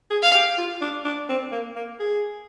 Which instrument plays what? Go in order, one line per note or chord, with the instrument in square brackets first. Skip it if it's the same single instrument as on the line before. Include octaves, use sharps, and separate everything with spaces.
[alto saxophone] G#4
[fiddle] F5
[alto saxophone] G4
F4
D4
D4
C4
A#3
A#3
G#4